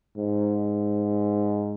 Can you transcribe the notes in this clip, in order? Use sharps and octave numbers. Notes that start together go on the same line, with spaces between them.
G#2